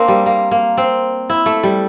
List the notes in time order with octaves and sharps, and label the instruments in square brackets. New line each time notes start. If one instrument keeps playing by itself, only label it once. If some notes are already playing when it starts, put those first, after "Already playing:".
Already playing: [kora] A#3 C4 D4 [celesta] A#4 F5 C6
[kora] G3
A#3
A#3
C4
E4
A3
G3